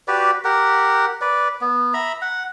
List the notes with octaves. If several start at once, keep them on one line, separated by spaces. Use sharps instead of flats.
F#4 G4 B4 D5
G4 A#4 F#5
B4 D5
B3
E5 A#5 B5
F#5